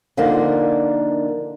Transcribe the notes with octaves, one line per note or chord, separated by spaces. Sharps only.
D3 F3 A#3 D4 D#4 A#4